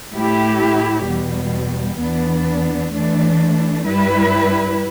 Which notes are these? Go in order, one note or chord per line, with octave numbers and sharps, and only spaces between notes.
A2 A3 E4 G4
E2 B2 G3
E2 E3 B3 D4
E3 A3 D4
G2 G3 E4 B4